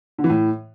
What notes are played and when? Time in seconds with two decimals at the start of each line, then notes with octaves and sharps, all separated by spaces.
0.18 D3
0.24 E3
0.30 A2